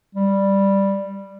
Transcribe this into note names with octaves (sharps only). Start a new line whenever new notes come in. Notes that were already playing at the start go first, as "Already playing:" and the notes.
G3